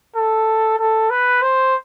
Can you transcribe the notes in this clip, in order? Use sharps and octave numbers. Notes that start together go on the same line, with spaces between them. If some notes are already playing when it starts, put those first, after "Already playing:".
A4
A4
B4
C5